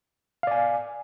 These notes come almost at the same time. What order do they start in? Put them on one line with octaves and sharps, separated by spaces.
F5 D5 G#5